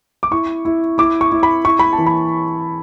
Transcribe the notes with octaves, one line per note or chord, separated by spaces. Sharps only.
D6
E4 C#6
E4
E4 D6
C#6
E4
B5
E4 C#6
B5
A5
E3
B5